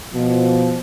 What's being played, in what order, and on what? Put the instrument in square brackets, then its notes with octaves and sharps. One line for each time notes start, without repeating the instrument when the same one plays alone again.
[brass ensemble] B2 F3